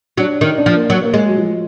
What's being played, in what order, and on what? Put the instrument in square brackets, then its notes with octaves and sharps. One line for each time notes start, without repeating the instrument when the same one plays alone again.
[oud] F#3 [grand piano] D4
[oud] D#3 [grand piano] D#4
[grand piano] D4
[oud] F3
[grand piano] A#3
[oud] F#3
[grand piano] A#3
[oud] G#3
[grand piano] F#3
F3